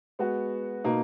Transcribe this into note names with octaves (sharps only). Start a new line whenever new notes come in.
G#3 B3 F#4
B2 A#3 D#4